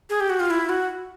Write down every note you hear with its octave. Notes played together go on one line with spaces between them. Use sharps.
G#4
G4
F#4
F4
E4
F#4